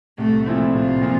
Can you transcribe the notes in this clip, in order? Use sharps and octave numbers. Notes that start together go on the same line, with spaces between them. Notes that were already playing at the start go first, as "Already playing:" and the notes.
C2 A3
A#2 F3 C4 E4
C2 F4
A#2 F3 C4